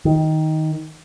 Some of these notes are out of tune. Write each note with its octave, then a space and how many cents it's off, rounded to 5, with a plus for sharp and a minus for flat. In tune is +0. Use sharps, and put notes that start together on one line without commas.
D#3 +10